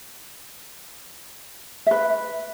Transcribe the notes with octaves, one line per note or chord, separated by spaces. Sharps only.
B4 E5